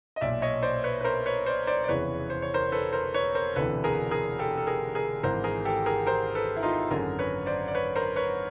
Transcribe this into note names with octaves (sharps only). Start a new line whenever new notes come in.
D#5
B1 A#2 D5 E5
C#5 D#5
C5 D5
B4 C#5
B4
A#4 C5
B4 C#5
C5 D5
C5 D5
D5
F1 E2 C#3 E3 B4 C#5
C5
C#5
A#4 C5
A4 B4
A#4 C5
B4 C#5
A#4 C5
E1 D2 C3 E3 A4 B4
G#4 A#4
G#4 A#4
G4 A4
A4
G#4 A#4
G#4 A#4
G#1 G#2 E3 A#4 C5
G#4 A#4
G4 A4
G#4 A#4
A#4 C5
A4 B4
E4
D#4 F4
G#1 F#2 D3 G#4 A#4
B4 C#5
C5 D5
D5
B4 C#5
A#4 C5
B4 C#5